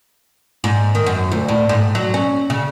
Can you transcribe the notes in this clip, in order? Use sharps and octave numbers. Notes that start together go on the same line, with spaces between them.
G#2
D#3
F#2
D2
A2
G#2
F#3
C#4
C#3